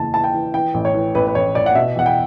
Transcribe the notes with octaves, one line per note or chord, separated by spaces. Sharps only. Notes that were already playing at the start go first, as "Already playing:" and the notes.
Already playing: F#1 E2 E3 A5
E3 A5
G5
E3
E3 G5
A1
C#5
E3
A1 B4
B4
A1 C#5
A1 D5
F#5
B2 E5
E2 F#5
G5